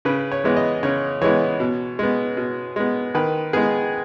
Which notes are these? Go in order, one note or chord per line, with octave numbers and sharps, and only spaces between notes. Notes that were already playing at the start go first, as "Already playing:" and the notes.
C#3 B4
C#5
E3 G#3 B3
D#5
C#3 C#5
E3 G#3 B3 C#5
B2
G#3 B3
B2
G#3 B3
D#3 B4
G#3 B3 G#4